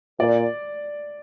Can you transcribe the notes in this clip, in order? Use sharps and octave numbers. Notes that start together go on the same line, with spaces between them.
A#2 D5